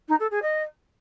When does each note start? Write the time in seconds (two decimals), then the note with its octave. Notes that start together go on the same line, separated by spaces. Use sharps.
0.08 D#4
0.19 A4
0.31 G#4
0.42 D#5